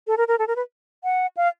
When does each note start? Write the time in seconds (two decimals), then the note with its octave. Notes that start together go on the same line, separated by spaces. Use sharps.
0.07 A4
0.18 A#4
0.28 A#4
0.39 A4
0.48 A#4
0.56 B4
1.04 F#5
1.37 F5